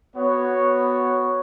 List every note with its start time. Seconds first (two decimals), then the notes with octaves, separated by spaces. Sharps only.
0.15 B3 F#4 C#5